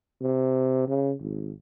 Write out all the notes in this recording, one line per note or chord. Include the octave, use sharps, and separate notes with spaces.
C3
C#3
G#1